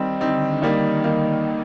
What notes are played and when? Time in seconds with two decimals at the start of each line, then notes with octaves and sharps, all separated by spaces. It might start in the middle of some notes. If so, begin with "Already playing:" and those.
Already playing: D#3 G3 C4 D#4
0.20 D3 G3 C4 D#4
0.62 D#3 G3 A#3 D#4
1.04 G3 A#3 D#4